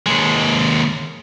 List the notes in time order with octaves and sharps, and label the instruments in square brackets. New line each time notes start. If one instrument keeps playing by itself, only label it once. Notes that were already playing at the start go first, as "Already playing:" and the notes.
[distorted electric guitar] D#2 G#3